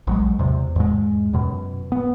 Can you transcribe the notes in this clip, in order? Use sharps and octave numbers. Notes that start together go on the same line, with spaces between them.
A#1 F#3 G#3
E2 C3
E2 G#2 G#3
F#2 B2
B3